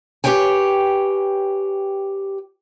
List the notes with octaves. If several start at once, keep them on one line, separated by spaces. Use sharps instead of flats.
G4 G#4 B4 C#5 G5 G#5